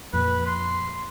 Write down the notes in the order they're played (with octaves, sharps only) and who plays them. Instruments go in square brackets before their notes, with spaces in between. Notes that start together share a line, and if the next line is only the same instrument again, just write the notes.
[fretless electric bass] F2 A#2 [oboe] B4
[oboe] C6